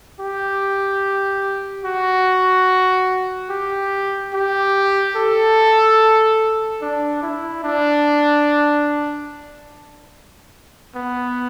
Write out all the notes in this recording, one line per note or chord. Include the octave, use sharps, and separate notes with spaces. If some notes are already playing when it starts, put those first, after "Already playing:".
G4
F#4
G4
G4
A4
D4
E4
D4
B3